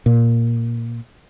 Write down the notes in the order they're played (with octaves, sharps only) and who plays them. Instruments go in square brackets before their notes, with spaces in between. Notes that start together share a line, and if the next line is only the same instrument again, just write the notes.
[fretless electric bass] A#2